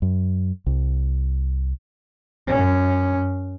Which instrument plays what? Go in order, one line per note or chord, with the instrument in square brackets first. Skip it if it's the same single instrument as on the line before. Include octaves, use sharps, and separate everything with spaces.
[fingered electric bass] F#2
C2
[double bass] F#2 C#4